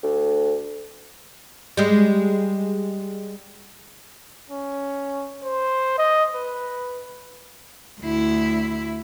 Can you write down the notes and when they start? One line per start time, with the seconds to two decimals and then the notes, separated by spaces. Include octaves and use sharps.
0.03 D2
1.77 G3 G#3
4.50 C#4
5.44 C5
5.98 D#5
6.35 B4
8.01 D2 E4